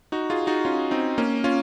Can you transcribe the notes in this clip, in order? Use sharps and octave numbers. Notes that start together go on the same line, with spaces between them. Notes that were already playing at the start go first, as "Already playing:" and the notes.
D#4 F#4
F4 G#4
D#4 F#4
C#4 F4
C4 D#4
A#3 C#4
C#4 F4